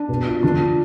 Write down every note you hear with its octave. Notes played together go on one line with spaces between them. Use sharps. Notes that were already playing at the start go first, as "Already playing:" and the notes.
Already playing: D4
B2
F4
D3 D4
F4